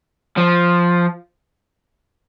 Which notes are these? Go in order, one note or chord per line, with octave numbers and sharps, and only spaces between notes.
F3